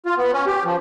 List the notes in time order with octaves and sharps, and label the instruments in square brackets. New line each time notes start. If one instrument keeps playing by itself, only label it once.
[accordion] F4
B3
C#4
G4
F3